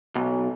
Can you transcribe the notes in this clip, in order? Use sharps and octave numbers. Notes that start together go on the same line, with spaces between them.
B1